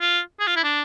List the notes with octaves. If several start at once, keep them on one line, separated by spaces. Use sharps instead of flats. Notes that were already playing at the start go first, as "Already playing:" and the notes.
F4
G#4
F4
E4
D4